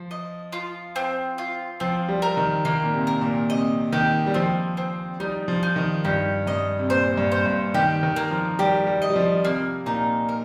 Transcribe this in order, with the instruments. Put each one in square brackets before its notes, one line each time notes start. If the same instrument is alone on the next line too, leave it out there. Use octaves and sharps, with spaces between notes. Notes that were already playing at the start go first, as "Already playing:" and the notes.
Already playing: [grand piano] F3
[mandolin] D#5
F4
C4
F4
[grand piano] F3 [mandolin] C4
[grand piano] G3
[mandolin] A#4
[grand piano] D#3
[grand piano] D#3 [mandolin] A#3
[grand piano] A#2
C3
[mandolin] A#4
[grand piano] A#2
[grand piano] C3 [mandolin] D#5
[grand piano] D#3 [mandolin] G4
[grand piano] G3
[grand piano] F3 [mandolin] C4
[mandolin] C4
[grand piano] G3 [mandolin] D#4
[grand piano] F3
[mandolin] D#4
[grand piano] D#3
[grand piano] G2 [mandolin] G4
[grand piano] G2 [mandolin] D#5
[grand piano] C3
[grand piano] A#2 [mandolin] C5
[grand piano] G2
[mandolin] C5
[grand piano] G2
[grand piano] D#3 [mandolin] G4
[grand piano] D#3
[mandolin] A#3
[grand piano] F3
[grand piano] G3 [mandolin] G4
[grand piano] G3
[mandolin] D#5
[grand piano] G3
F3
[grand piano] C3 [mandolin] A#3
[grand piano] A#2 [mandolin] D#4
[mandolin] A#4